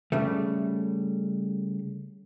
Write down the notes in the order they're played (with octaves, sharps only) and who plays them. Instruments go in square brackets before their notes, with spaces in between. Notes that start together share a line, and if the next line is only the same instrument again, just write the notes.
[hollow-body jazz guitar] C#3 G3 A3